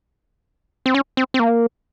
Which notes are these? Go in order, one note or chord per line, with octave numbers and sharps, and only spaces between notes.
C4
C#4
C4
C4
A#3